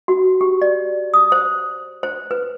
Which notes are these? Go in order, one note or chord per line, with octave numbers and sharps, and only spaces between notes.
F#4
G4
D5
D#6
C5
C5
B4